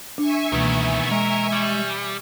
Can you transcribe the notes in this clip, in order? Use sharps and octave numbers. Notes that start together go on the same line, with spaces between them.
D4 E5 G#5 C#6
C#2 B2 D#3 E3 A#3 B3
G#3 A#4
G3